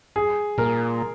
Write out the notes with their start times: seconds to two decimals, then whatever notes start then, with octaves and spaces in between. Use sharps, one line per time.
0.16 G#4
0.58 A#2 A#4